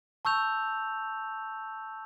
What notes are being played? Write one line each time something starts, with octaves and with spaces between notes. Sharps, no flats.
A5 C#6 E6 G6 F7